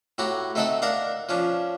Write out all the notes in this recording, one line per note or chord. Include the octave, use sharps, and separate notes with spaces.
A2 F#4 G4 A#5
A3 C4 D#4 A4 E5 F#5
D4 A#4 F5 F#5 A#5
F3 C#4 D4